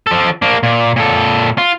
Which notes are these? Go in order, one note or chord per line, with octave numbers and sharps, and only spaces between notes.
F3 A4
A#3 D4
A#2
A#2 A4
F4